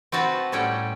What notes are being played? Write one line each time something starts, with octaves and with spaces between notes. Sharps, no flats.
C4 F#4 B4 A5
A2 G3 C#4 F#5 G5